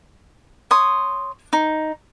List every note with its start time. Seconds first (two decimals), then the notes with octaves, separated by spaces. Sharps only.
0.71 C#5 C6 D#6
1.53 D#4